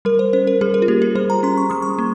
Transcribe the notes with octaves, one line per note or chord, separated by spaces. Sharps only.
G3 A#4
C5
C#4 C5
A#4
G3 G#4
A#4
F4
A#3 G4
G#4
G3 C5
A#5
C#4 C6
C#6
G3 D#6
C#6
A#3